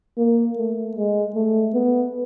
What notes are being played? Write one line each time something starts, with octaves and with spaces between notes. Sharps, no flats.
A#3
A3
G#3
A3
B3